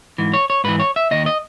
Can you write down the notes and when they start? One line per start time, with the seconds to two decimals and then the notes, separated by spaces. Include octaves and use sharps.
0.18 G#2 E3
0.34 C#5
0.50 C#5
0.64 G#2 E3 B4
0.80 C#5
0.96 E5
1.11 D#2 D#3 D#5
1.26 D#5